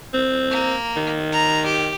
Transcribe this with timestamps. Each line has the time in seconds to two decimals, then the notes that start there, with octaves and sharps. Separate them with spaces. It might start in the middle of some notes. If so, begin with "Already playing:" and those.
0.14 C4
0.51 A#3
0.96 D#3
1.32 A#5
1.65 G4